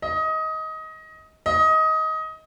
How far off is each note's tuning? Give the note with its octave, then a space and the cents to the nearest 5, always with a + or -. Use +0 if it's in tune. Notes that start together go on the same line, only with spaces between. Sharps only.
D#5 +20
D#5 +20